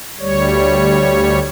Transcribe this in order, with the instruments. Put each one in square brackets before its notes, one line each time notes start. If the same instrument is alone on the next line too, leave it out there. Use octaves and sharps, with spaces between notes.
[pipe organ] D2 G3 C#5